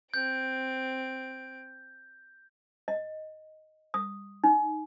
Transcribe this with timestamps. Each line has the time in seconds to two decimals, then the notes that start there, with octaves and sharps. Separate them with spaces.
0.14 C4 G6 D7
2.88 D#5
3.94 D#6
4.44 D#4